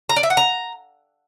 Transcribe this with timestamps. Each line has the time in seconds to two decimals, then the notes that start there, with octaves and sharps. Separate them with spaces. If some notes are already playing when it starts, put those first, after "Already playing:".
0.09 A#5
0.16 D5
0.23 E5
0.30 F#5
0.37 A#5